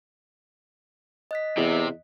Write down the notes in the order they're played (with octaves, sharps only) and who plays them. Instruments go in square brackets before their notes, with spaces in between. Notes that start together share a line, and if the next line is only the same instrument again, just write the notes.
[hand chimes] D#5 F#6 B6
[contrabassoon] E2 [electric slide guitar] C3